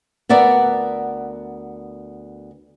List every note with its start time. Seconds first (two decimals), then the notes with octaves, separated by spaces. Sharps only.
0.29 D2 B3 A#4 D5 E5 F#5